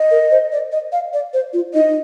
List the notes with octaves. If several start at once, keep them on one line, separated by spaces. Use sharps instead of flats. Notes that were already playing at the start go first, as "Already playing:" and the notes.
Already playing: D#5
A#4
C5
D5
D#5
F5
D5
C5
F4
D#4 D#5
D#4